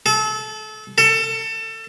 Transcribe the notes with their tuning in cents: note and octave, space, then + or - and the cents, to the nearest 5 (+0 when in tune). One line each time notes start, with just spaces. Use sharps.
A4 -30
A4 +25